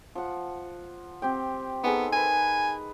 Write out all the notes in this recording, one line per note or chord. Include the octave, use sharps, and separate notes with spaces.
F3 F#5
C4 G4 G5
B3 D#4 G#4 A4
A#4 B4 G#5